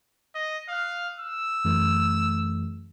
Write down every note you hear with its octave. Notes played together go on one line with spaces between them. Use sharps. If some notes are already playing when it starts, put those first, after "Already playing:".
D#5
F5 D#6 F6 F#6
E6
F#2 E3 A3